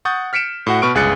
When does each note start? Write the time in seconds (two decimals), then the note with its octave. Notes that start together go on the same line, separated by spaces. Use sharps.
0.05 F#5 C#6 D#6 G6 A6
0.33 F6 B6 C#7 D7 E7
0.67 A2 F#4 F#5
0.82 B2 B4 C#6 F6 D7
0.95 G1 C#2 G#4 F#6 A6 C#7